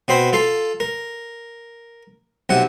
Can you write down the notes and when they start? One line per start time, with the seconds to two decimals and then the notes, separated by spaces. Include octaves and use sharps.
0.08 B2 C4 C5 B5
0.33 F4 A4 F5
0.80 A#4
2.49 B1 C3 F#5